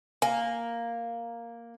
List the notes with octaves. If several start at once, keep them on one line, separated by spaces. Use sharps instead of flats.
A#3 G#5